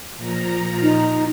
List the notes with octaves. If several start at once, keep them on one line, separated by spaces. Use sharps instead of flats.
A#2 F3 A#5
D#4